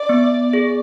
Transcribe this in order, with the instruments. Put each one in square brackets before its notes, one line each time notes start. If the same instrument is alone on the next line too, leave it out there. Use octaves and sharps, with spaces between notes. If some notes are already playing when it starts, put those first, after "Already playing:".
Already playing: [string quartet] D5
[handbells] B3
G#4